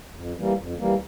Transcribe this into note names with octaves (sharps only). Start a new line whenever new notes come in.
F2
E3 G3 A#3
F2
E3 G3 A#3